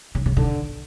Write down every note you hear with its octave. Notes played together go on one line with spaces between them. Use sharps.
C#3
C#3
D3